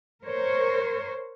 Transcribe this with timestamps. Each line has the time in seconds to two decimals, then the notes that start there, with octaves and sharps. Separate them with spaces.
0.23 A#4 C5 C#5